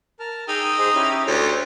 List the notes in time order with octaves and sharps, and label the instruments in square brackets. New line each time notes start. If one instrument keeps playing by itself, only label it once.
[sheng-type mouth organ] A#4 A5 F6
[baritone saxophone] D#4 [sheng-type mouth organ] G#4 G5 E6
[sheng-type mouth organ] G#4 C5 D#5
C#4 E4 G4
[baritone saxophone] D2 [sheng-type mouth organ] C#5 C6